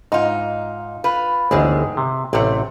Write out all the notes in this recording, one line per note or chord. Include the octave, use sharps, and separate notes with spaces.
G#2 D#4 F4
F4 B4
G1 D2 D#3 E3 G#3
C3
A1 C3 A3 C4 F#5